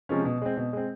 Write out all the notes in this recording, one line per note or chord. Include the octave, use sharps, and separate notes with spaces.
C3 F3 G#3 C#4
B2
G#3 C4
B2
G#3 C4